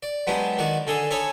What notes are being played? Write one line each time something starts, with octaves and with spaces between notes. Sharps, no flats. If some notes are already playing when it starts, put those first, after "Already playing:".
D5
F#3 G#3 B3 D4 G4
D#3 F#4 D5
D3 G#4 A4 D#6
A4 C#5 G#5 B5 D#6